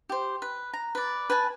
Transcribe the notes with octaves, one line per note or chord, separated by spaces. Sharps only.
G4 C5
B4
A#5
B4 D5
B4 G#5 A5